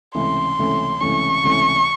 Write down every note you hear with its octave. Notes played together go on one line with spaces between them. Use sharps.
C#2 C3 E3 A3 C#4 C6
C#2 C3 E3 A3 C#4
C#2 C3 E3 A3 C#4 C#6
C#2 C3 E3 A3 C#4